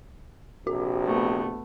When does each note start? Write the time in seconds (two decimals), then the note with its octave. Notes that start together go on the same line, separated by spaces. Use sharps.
0.67 A#1 C3 F#4
1.05 A3 B3